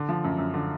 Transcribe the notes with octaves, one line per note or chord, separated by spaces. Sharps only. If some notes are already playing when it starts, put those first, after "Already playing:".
Already playing: D3
F3
F#2
F#2
D3